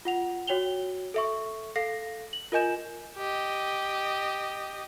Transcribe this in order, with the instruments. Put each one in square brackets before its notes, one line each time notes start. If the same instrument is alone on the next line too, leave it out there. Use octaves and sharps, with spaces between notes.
[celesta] F4 F#5 F7
F#4 C#5 G5 F7 G7
A4 E5 C#6
A4 F5 A#6 C7
F#7
F4 A#4 D#5 G#5 G6 E7
[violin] G4 D#5